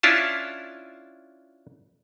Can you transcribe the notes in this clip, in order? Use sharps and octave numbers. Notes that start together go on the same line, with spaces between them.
C#4 D4 E4 F4 A5